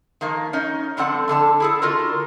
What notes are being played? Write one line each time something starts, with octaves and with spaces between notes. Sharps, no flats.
D#3 F3 A#3
C#4 D#4
G2 D3 F3 C4 A4 F#5
F2 D3 A4 A5
E4 G#4 A4
D3 F4 F#4 A4 A#4